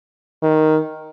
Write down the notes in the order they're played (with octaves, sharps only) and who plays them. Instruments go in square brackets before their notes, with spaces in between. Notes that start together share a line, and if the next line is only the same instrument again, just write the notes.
[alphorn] D#3